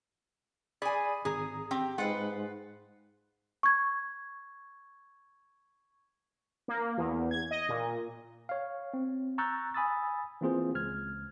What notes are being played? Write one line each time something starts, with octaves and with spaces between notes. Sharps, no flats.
G#4 D5 G#5 B5 D#6
G#1 G#4 A#5 D#6
C4 G4
G#2 G#3 F4 B4 F#5
C#6 G#6
A#3
E2
G#6
D#5
A#2
C#5 F5
C4
A#5 C#6 E6 F#6 G6 A6
G#5 B5 D#6 E6 A6
E3 A#3 C4 F4 G#4 C5
C#2 F6 G#6